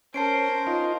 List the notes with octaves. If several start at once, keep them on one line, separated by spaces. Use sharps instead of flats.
C#4 A#4 C5 A5 C7 D7
D#4 F4